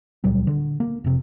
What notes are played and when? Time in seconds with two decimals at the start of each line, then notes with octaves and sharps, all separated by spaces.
0.24 C#2 A#2 F#3 G3
0.47 D3
0.80 A#3
1.04 F1 C3